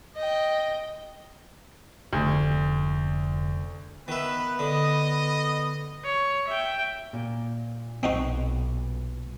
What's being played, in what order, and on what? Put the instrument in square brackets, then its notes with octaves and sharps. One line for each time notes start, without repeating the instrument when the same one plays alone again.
[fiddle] D#5 G5
[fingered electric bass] F1 D3 [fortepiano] D2
[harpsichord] D#3 E5 [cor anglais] B3 [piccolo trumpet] B4
[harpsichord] D3 [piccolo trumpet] D#5
[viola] C#5
E5 G5
[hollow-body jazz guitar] A#2
[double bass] B1 [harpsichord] C4 D#4 F#4